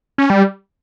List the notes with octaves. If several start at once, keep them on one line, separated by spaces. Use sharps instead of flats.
C#4
G3